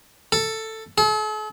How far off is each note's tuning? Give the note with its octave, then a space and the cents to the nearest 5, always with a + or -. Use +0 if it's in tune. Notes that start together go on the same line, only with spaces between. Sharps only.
A4 +10
A4 -45